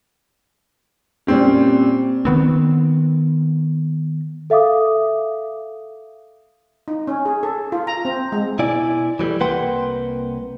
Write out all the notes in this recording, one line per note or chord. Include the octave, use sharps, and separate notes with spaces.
A#2 G3 C4 C#4
D#3 B3 C4
A4 E5 F5 D6 D#6
D#4
C#4
G#4
A4
F4
A#5
C4
G#3
B2 E4 D5 G#5
E3 F#3 G3 A3
C2 A#3 B4 F#5 G5 C6